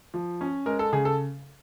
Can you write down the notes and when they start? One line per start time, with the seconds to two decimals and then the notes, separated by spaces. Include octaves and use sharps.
0.14 F3
0.41 C#4
0.66 G#3 A#4
0.79 A4
0.93 C#3 G#4
1.05 A4